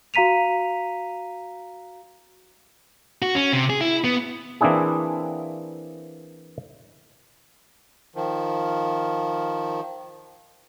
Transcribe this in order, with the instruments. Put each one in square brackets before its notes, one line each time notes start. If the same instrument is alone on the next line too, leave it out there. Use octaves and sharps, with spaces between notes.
[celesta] F#4 F5 A#5 B6 D#7 F7
[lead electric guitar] F#4
C#4
C3
G#4
E4
B3
[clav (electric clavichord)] E3 A#3 C4 D4 E4 G#4
[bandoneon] D#3 F3